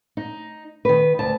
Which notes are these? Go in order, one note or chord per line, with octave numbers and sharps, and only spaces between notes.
D#4
D#3 B4
D2 A5